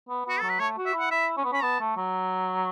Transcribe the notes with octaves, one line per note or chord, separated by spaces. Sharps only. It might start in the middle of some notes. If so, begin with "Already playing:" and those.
B3
B3 F#4
F#3 A4
B4
A3 C#5
F#4
E5
E4
F#5
E4 E5
C#4
B3
C#4 B5
B3 A5
A3
F#3